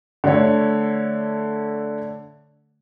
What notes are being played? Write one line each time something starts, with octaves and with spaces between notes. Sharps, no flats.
D3 A3 C#5